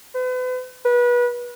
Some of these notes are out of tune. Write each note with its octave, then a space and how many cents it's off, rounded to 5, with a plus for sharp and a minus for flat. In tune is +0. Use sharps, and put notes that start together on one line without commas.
B4 +40
B4 -30